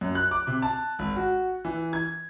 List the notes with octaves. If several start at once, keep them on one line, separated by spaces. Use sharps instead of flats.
F#2
F#6
D6
C3
A5
G#1
F#4
E3
G#6